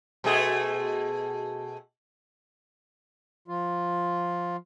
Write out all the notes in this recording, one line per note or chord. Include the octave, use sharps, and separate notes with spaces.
B2 A3 G#4
F3 F4